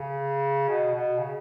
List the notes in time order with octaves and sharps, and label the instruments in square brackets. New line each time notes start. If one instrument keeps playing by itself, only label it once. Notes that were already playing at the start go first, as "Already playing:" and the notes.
Already playing: [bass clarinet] C#3
B2
B2
C#3